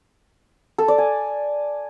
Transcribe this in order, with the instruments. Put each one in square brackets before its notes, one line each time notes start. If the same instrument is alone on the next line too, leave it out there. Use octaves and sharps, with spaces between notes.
[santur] A4
D5
G#5